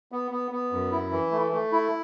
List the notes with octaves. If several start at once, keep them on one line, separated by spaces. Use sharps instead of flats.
B3
B3
B3
F#2
E4
E3
A3
A3
E4